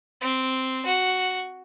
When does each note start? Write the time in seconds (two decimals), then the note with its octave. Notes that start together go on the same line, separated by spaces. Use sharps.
0.21 C4
0.85 F#4